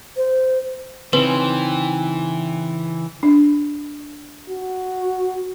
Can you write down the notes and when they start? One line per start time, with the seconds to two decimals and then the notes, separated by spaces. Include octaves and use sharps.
0.17 C5
1.13 C#3 E3 C4 D#4 B4
3.23 D4
4.49 F#4